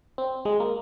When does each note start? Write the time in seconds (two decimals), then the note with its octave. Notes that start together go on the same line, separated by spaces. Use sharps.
0.18 C4
0.45 G#3
0.60 A#3